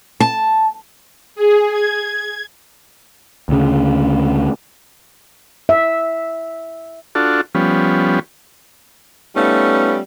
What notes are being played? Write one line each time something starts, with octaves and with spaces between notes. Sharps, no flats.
A5
G#4
G#6
D2 C#3
E5
D4 F4 F#4 A4
F3 G3 B3 C#4
G3 A3 B3 C#4 D#4 F4